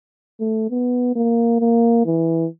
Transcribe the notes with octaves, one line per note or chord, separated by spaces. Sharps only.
A3
B3
A#3
A#3
E3